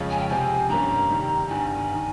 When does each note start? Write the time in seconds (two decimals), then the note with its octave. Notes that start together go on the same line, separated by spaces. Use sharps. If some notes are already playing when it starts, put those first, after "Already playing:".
Already playing: F2 C#3 G#3 C#4 F4
0.11 G#5
0.20 G5
0.29 C3 F3 C4 G4 G#5
0.69 G2 G3 A#3 C#4 A#5
1.09 C3 D#3 G3
1.49 G1 G2 D#3 G#5
1.93 D#3